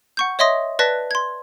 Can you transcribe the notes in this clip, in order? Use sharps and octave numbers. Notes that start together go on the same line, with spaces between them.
F#5 C#6 G6
C#5 D#5 E5 C6 D#6 A#6
B4 D5 A5 F#6 A#6 B6
C6 G#6